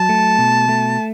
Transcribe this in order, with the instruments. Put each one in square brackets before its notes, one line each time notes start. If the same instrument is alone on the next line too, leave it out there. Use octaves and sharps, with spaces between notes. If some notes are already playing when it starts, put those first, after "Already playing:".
Already playing: [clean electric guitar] F#3 [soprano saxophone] A5
[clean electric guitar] A3
B2
A3